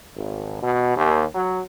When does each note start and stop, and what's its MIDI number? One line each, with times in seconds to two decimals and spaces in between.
0.16 0.60 32
0.62 0.92 47
0.96 1.24 39
1.34 1.60 54